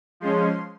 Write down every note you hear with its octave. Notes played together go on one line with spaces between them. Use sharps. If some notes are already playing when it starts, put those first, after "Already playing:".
F3 G#3 C#4 C6